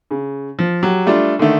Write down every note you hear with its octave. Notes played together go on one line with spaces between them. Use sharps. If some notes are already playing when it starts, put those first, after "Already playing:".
C#3
F3
F#3 G4
G3 A3 D4 F4
D3 D#3 A3